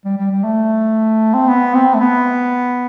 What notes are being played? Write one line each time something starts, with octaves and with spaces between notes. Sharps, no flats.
G3
G3
G3
A3
C4
B3
C4
A3
B3